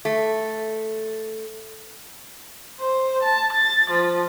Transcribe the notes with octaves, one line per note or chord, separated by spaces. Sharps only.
A3
C5
A5
A6
F3